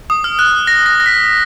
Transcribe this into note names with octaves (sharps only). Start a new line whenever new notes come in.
D#6
F6
F#6
A#6
A#6
A#6
B6